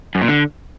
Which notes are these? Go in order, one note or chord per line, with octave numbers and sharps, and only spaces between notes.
F#2
A#2
D3